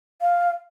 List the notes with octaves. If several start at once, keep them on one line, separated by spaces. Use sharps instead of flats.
F5